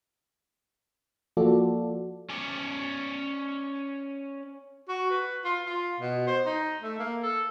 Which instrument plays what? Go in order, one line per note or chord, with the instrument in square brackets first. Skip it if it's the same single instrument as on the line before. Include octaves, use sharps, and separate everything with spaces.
[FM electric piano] F3 A#3 F4 F#4 A4 D5
[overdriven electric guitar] C#4 D5
[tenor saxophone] F#4
B4
F4
F4
B2
C5
D#4
A3
A#3
A4